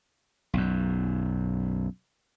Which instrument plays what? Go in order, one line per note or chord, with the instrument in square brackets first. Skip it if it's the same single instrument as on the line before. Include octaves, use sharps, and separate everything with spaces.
[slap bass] B1 F#2